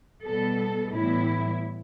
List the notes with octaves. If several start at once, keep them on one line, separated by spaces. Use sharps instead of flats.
B2 G3 B3 A4
A2 E3 G3 B3 E4